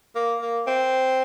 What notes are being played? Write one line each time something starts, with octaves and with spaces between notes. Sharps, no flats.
A#3
A#3
C4